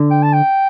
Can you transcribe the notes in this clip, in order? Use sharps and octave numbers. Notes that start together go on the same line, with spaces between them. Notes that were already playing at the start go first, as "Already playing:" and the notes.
Already playing: D3
G5
A5
G5